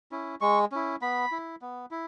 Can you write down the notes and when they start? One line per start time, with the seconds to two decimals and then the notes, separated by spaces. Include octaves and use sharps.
0.12 C#4 E4
0.41 G#3 C#6
0.72 C#4 E4
1.02 B3 B5
1.32 E4
1.62 B3
1.91 E4